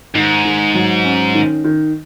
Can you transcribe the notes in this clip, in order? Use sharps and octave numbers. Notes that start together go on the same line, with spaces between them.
G#2 D#3
D#3
F#3
C#4
D#3
D#3